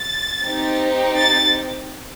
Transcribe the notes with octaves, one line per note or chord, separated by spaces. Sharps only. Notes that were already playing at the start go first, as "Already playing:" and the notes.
Already playing: A6
C4 D#4 G4
A6